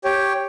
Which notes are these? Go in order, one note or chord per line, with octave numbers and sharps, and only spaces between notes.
G4 C#5 G5